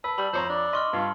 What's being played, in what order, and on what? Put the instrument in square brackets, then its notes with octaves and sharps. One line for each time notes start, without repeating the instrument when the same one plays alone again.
[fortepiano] B4 [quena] A5 [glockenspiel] E6
[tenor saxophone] G3 [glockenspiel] B5 F#7
[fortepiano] F2 C#5 A#5 [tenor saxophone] C5
[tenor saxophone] D4 [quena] D6
[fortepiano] D#5 [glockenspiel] C6 C#6 F6
[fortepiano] G2 [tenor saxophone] F4 [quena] A5